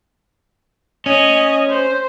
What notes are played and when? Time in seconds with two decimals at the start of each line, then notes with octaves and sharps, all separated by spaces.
1.06 C#4 D#5 G#5
1.69 C5